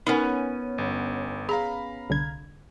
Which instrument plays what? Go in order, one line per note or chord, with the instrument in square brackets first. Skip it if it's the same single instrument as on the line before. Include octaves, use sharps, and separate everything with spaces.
[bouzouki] B3 C#4 [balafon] D#4 A#4 F#5
[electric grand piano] G1
[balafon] G#4 [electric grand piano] F5 A#5 B5
[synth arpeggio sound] C2 D3 G#6